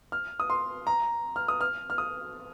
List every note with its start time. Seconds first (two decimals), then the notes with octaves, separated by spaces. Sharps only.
0.12 F6
0.40 D#6
0.50 C6
0.87 A#5
1.36 F6
1.48 D#6
1.61 F6
1.90 F6
1.98 D#6